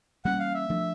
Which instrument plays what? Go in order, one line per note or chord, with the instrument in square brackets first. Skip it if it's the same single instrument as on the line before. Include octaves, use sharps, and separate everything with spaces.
[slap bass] E3 G3 A#3 C#4 [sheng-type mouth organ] F#5
[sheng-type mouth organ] F5
E5
[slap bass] F3 A3 D4